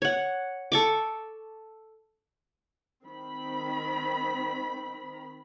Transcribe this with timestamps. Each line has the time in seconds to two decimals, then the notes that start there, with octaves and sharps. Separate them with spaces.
0.02 C#5 F#5
0.72 A4 C#6 D6
3.05 D#3 C4 B5